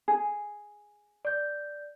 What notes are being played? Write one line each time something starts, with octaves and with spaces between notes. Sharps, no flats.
G#4
D5 G6